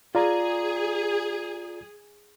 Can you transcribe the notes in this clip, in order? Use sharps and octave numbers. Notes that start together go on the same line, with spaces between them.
F4 G#4 D5 A#5